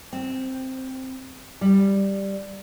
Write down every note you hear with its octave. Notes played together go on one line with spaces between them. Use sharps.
C4
G3